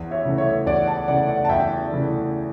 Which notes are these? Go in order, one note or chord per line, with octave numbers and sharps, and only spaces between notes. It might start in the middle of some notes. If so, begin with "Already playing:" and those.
Already playing: E2
C#5 E5
C#3 E3 A3
C#5 E5
E2 D5 F#5
F#5 A5
C#3 E3 A3 D5 F#5
D5 F#5
A5
E2 E5 G5
C#3 E3 A3